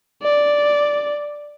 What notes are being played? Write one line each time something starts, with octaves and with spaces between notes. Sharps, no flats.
D5